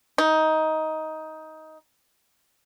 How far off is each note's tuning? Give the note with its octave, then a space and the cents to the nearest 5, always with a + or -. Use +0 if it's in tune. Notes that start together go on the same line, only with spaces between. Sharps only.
D#4 +15